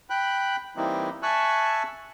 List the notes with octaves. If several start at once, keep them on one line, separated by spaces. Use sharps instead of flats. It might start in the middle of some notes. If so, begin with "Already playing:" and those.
G5 B5 F#6
E3 G3 A#3 C4 D#4 E4
E5 G#5 A5 C#6 E6 F#6